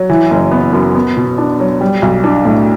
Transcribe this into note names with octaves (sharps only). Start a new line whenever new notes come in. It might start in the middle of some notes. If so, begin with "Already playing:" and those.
Already playing: F#3
E3
F#1
B3
F#2
B3
B2
D4
F#3
G3
B1
D4
A2